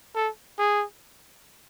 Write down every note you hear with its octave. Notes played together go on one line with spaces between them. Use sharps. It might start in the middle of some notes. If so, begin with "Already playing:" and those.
A4
G#4